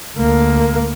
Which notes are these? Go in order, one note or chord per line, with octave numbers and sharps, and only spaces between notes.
D2 A#3